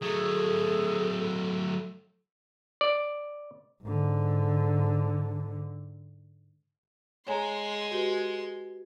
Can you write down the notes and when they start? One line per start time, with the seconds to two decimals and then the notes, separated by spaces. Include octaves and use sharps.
0.02 F#3 A3 G#4 A4
2.81 D5
3.84 G#2 D3
7.27 G#3 C#5 G#5 A#5 C6
7.91 F#4 G4 B4